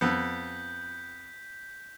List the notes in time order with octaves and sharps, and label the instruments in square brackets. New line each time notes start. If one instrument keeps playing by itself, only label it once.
[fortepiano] F2 B3 [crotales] G6 B6